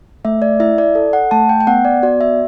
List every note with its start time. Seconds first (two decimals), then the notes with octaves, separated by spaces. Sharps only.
0.25 A3 E5
0.42 D5
0.60 E4 E5
0.78 D5
0.95 A4
1.13 F#5
1.31 A3 A5
1.49 G5
1.60 G5
1.67 B3 F#5
1.85 D5
2.03 F#4 D5
2.21 E5